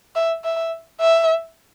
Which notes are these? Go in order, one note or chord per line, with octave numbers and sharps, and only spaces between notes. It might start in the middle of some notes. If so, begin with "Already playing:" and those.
E5
E5
E5